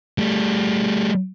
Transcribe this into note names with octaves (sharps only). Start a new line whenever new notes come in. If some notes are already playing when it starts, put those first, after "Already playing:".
G3 A3